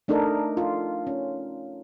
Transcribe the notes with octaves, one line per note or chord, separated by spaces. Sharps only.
A3 D4 D#4 A4 A#4
F4
C#4